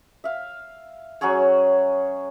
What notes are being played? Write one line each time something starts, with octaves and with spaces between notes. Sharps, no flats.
E5 F5
F#3 C#4 G#4 C#5